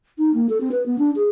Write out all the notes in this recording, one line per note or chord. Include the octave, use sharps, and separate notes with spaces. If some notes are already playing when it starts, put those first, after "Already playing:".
D#4
A#3
A4
C4
B4
B3
D4
G#4